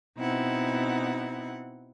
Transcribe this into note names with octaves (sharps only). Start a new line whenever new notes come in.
B2 C4 D#4 E4 F#5